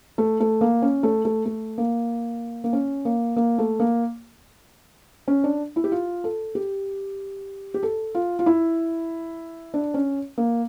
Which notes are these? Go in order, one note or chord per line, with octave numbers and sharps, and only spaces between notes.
A3
A3
A#3
C#4
A3
A3
A3
A#3
A#3
C#4
A#3
A#3
A3
A#3
C#4
D4
E4
G4
F4
A4
G4
G4
A4
F4
F4
E4
D4
C#4
A#3